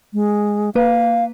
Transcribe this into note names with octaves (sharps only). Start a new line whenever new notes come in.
G#3
A#3 B4 F5